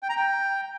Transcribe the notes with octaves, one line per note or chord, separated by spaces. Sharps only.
G5
A#5
G5